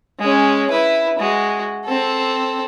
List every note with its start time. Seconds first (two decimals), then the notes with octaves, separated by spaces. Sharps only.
0.20 G#3 C#4
0.70 E4 B4
1.19 G#3 F#4
1.85 C4 A4